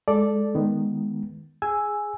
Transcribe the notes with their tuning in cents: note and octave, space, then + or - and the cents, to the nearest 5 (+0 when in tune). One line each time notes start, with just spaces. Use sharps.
G#3 +0 A4 -5 D5 +0
D#3 +0 G#3 +0 B3 +0
G#4 +0 G#5 +0 E6 +0